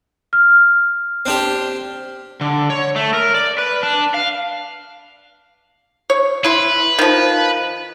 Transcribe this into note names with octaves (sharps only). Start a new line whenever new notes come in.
F6
C4 D4 G4
D3
C#5
A3
A#4
D5
B4
D4
F5
C#5
E4 B4 C6
D#3 F3